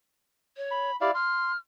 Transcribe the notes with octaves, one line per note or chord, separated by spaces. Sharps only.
C#5
B5
E4 G4 D5 F5
C6 F6